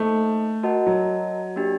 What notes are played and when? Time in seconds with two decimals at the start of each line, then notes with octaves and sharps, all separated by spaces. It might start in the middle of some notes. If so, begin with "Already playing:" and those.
Already playing: A3 A#3 D#4 A4 C5 D#5
0.63 F#4 A#4 D#5 F#5 A5
0.87 F#3
1.56 A#3 D4 G4